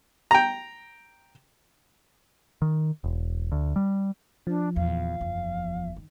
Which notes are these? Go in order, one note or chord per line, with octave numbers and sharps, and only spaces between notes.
G5 A#5
D#3
E1
D2
G3
F3 D4
D#1 E2 F5
F#1 E2
D#3